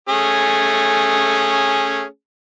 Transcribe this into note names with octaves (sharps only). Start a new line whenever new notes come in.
A3 C#4 G#4